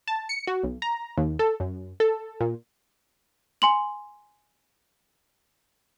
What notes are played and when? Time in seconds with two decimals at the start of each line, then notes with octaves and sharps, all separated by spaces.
0.08 A5
0.29 C#7
0.47 F#4
0.63 B1
0.82 A#5
1.18 D#2
1.39 A4
1.60 F#2
2.00 A4
2.41 A#2
3.62 G#5 C6 F#7